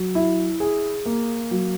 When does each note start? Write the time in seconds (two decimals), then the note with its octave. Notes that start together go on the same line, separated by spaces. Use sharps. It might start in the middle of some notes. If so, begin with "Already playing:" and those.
Already playing: F#3
0.15 E4
0.60 G#4
1.06 A#3
1.51 F#3